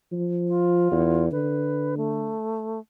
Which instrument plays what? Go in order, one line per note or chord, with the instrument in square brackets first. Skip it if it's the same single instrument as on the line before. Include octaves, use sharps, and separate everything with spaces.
[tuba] F3
[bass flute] F4
[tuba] E2
[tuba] D3 [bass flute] B4
[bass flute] A3